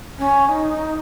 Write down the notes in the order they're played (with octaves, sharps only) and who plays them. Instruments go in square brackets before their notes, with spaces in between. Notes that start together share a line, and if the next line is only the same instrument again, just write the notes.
[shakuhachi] C#4
D#4